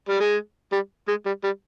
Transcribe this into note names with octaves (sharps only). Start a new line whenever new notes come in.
G3
G#3
G3
G#3
G3
G3